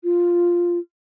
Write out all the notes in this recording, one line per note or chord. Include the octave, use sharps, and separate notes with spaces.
F4